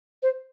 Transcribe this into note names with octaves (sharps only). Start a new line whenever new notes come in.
C5